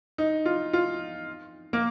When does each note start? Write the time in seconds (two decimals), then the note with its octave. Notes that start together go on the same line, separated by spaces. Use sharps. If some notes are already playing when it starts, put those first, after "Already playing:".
0.18 D#4
0.46 F4
0.73 F4
1.73 A#3